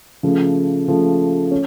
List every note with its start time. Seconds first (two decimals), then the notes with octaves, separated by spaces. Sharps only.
0.23 C#3 F3 A3
0.88 C#3 F3 A3
1.51 C#4